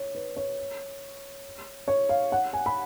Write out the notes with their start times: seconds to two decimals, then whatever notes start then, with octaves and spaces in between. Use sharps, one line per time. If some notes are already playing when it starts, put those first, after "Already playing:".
Already playing: C#5
0.15 B4
0.36 C#5
1.88 C#5
2.09 F5
2.32 F#5
2.53 G#5
2.66 B5